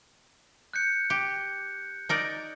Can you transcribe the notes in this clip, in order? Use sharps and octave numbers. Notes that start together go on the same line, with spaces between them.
F#6 G6 C#7
G4
D#4 A#4 D5